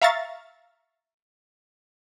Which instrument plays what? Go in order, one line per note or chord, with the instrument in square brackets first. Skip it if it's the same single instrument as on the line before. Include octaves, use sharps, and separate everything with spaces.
[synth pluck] E5 F5 A#5 C#6 A6